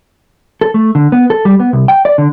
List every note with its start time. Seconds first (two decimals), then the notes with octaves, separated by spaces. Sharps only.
0.61 A4
0.74 A3
0.95 D3
1.12 B3
1.30 A4
1.45 G3
1.60 B3
1.73 C2
1.88 G5
2.05 D5
2.18 D3